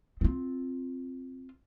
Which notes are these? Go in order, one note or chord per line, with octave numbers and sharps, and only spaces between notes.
C4 F4